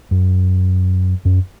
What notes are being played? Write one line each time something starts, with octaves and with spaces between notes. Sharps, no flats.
F#2
F#2